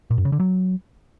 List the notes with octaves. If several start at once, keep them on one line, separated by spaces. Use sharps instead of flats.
A#2
F#2
C#3
D3
F#3